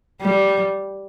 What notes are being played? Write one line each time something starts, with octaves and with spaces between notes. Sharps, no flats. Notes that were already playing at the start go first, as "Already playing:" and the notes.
G3